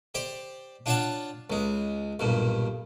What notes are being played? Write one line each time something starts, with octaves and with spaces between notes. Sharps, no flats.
G4 C5 D5
D4 F4 C#5 D5 F#5 A5
C#2 G#3
B1 G2 A#2